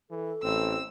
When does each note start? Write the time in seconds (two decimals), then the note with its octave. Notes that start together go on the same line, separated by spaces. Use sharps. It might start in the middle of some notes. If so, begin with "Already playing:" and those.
0.10 E3 A4
0.44 A1 C4 E6